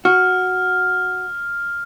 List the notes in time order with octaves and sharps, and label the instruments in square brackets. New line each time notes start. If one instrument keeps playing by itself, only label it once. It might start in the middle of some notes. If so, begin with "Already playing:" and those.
[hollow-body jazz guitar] F#4 [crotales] F6